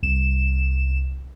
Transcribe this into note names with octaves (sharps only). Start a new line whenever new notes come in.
C2 E7